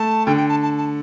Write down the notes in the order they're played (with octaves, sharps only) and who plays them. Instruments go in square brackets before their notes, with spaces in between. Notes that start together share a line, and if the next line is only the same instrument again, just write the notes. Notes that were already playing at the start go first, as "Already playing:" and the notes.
Already playing: [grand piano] A3 [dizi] A5
[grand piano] D3 [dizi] G5
[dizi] G5
A5
A5
A5